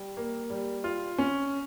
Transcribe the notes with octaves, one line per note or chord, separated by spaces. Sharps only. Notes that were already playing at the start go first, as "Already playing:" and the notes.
Already playing: G3
A#3
G3
F4
C#4